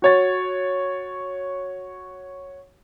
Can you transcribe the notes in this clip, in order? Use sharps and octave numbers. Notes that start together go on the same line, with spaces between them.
F#4 C#5 A6